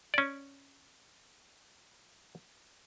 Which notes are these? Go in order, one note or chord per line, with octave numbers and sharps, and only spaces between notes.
C#4 D5